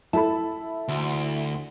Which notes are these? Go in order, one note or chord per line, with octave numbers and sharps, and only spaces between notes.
E4 A4 A5 B5
D2